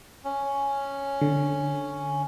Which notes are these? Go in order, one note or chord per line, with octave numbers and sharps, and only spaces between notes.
C#4
D3